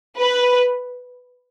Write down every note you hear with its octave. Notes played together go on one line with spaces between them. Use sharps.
B4